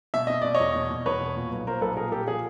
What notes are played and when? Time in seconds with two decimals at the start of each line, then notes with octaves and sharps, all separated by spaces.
0.14 B2 E5
0.27 B2 D#5
0.41 B2 D5
0.55 C#5 D#5
0.60 E2
0.76 B2
0.91 B2
1.06 E2 B4 C#5
1.21 B2
1.36 A#2
1.51 B1
1.66 A#2 A#4 C5
1.81 B1 A4 B4
1.97 A#2 G#4 A#4
2.12 A#2 G4 A4
2.28 F3 G#4